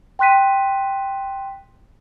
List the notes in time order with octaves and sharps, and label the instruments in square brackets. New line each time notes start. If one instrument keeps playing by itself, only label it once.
[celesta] G5 C6 F#6 B6 D#7